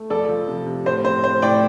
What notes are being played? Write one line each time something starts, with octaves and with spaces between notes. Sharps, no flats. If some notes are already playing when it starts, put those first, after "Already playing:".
Already playing: A3
F2 A4 D5
F3
C3
C3
A2 C5
C4 C5
A2 C5
A2 D5 G5